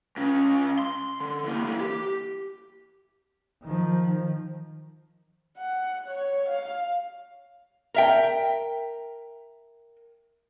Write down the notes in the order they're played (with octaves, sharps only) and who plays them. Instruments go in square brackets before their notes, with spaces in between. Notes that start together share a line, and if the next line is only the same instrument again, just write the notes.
[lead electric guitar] C#2 C#3
C6
D3
E3 A#3
C#3 E3
G4
[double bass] D#3 F3
[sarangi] F#5
C#5
F5
[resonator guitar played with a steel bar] A#4 E5 G5